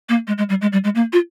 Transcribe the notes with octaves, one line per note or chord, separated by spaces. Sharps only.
A#3
G#3
G#3
G3
G#3
G3
G#3
A#3
F4